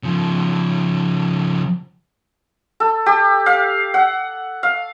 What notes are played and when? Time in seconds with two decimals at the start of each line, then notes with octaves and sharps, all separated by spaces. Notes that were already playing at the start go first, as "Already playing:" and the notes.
0.03 C#3 F3
2.80 A4
3.06 G4
3.46 F5
3.94 F#5
4.63 F5